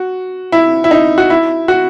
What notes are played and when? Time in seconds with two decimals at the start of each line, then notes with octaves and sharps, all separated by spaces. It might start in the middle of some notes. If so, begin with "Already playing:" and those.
Already playing: F#4
0.52 E4
0.84 E4
0.91 D#4
1.18 F#4
1.30 E4
1.68 F#4